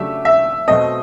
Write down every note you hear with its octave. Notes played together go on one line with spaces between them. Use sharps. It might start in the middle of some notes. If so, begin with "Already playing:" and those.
Already playing: C#3 F#3 A3 D4 G4 E5
E5
B2 F#3 A3 C4 D#5